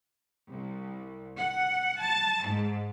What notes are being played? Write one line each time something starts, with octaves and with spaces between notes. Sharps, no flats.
C2
F#5
A5
G#2